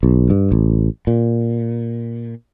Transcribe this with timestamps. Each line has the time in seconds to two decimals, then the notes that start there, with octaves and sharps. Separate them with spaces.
0.03 B1
0.30 G2
0.52 A1
1.07 A#2